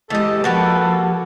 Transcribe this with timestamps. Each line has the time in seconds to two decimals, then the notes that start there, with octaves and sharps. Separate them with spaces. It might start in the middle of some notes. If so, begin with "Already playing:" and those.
0.10 E3 G#3 G4 A4 D#5
0.44 F3 A#3 F#4 G4 A4 B4